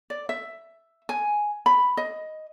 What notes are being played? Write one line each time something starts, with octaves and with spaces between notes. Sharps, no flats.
D5
E5
G#5
B5
D#5